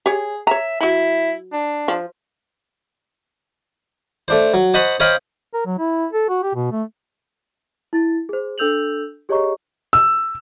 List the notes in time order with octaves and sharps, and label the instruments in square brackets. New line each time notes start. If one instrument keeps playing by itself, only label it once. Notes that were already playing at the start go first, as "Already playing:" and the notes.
[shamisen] G4 C#5 [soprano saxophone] G#4
[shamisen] C#5 A#5 [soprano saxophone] E5
[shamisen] F#3 B5 [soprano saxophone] E4
[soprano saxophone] D4
[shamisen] F3
[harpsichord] A3 D4 C5
F#3
C5 D#5 F#5 A5 B5 C#6
C5 C#5 D#5 F5 G5 B5
[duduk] A#4
F#3
E4
A4
F#4
G4
B2
A3
[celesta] E4 A6
G#4 C5
D4 A4 E6 G6 F7 F#7
G4 G#4 C#5 D#5 A#5 C#6
[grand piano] E6